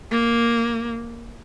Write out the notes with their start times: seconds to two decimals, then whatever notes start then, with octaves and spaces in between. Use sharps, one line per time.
0.12 A#3